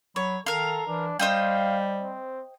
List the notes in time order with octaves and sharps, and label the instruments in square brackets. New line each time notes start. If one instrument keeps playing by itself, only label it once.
[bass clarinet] F#3 [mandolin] C#5 [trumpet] B5
[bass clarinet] D#3 [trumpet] A4 [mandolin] A#4 F5
[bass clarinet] E3 [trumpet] D4
[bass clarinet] G3 [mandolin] C5 D#5 G5 [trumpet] F5
[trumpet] C4